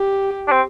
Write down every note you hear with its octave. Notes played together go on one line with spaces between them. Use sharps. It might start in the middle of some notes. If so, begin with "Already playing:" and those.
Already playing: G4
D4
C4